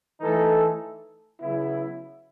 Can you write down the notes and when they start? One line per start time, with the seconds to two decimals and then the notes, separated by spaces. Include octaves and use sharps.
0.20 E3 A3 D#4 A4
1.39 C#3 F#3 B3 E4